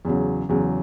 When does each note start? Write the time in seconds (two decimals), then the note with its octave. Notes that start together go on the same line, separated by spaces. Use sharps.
0.05 E2 C#3 F#3
0.49 E2 C#3 F#3